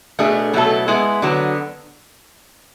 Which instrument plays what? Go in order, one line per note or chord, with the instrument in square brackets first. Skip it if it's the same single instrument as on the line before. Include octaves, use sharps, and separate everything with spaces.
[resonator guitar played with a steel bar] B2 A3 D4 G#4
B2 F#3 A3 E4 A4
G#3 B3 E4
D3 F#3 B3